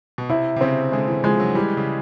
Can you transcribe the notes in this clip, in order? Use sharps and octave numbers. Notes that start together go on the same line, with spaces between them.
B2
C3 E4
C3
C#3 C4
D3 G#3
E3
F3 G#3
F#3
E3 G3
C#3